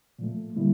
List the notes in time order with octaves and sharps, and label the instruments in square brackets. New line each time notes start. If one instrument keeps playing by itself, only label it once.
[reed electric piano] A#2 F3 A3
D3 G3 A#3 E4